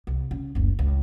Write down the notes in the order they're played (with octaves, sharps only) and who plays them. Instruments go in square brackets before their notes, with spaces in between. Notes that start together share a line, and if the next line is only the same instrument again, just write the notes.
[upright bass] C2
C#3
F#1 D2
C#2